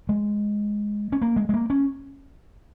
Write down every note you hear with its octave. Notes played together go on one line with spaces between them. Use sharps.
G#3
C#4
A#3
G#3
G#3
A#3
C#4